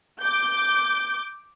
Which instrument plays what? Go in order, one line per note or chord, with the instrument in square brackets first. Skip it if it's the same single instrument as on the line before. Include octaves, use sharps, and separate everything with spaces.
[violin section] D6 G6